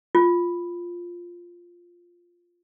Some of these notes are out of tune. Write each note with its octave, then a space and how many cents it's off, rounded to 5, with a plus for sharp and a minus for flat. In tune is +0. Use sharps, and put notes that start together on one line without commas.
F4 +0